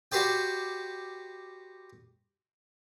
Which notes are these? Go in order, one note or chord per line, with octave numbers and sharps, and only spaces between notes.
F#4 G4 B4 C5 D5 G5